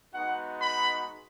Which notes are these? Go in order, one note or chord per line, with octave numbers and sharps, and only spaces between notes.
G#3 B3 D#4 F#4 F#5
B5